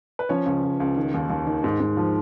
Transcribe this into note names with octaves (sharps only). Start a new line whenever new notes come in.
B4
F3 C#4 C#5
C#2
C#2
C#2
D#3
D#2
D#2
D#3
G#2
G#2
F3